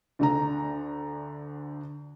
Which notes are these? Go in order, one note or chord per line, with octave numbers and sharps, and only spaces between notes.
D2 D3 A#5